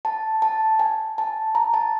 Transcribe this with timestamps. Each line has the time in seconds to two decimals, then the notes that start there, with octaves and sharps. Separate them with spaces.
0.05 A5
0.42 A5
0.80 G#5
1.18 A5
1.55 A#5
1.74 A5